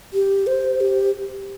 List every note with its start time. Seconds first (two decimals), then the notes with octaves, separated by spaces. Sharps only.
0.14 G4
0.47 C5
0.81 G4